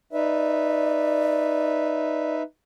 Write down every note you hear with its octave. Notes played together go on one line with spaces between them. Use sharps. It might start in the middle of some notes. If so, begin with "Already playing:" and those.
D#4 B4 D5 E5